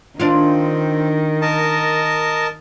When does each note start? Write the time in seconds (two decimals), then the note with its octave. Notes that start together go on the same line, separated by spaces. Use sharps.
0.20 D#3 C4 D4 F4
1.42 A#4 D#5 A5